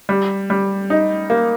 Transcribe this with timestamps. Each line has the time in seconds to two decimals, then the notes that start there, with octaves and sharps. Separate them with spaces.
0.09 G3
0.50 G3
0.90 D#4
1.30 A#3